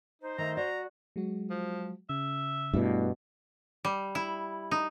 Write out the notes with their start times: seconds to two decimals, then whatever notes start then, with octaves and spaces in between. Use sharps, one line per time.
0.22 D#4 C5
0.38 D#3 A3 A#5
0.57 F#4 D5 A#5
1.16 F#3 G#3 F#4
1.50 F3
2.10 C#3 E5
2.74 G2 B2 A3 E4 D5
3.85 G3
4.15 E4
4.71 D#4